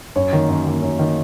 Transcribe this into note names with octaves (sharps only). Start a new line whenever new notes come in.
F#2 C#5
D#3 A#3
F#2
D#3 A#3
F#2
D#3 A#3